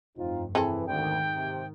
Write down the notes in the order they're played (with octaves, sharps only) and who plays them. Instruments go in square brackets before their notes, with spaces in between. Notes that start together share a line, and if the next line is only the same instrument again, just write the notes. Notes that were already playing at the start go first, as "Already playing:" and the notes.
[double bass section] F1 G2 [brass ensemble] C4 D#4 F4
[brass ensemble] E3 [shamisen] C4 G#4 A4
[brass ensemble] D2 [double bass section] G#2 D#3 [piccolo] G5
[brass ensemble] C3